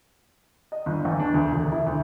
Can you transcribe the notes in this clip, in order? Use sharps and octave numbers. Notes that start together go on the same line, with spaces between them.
D#5
G1
E2
D4
D2
E1
E4
D2